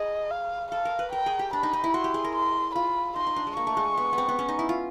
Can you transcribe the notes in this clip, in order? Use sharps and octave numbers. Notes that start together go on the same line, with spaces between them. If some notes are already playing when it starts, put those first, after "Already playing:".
Already playing: G#4 D#5
F5
A4 F5
A#4
B4
A#4 G5
G#4
G4
D4 B5
D#4
D#4
E4
F#4 C6
G4
G#4
A#4
C6
F4 B5
D#4 C6
D#4
D4
G#3
A#3 C#6
A3
G#3
B3
B3
C4
B3
C#4
D#4
E4
F4